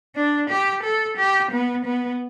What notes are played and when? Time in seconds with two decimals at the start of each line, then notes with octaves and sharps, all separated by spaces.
0.16 D4
0.49 G4
0.83 A4
1.17 G4
1.51 B3
1.85 B3